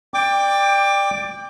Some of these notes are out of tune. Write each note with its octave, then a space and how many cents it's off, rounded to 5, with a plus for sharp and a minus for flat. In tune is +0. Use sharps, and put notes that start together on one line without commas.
D5 +15 G5 +20 D6 +0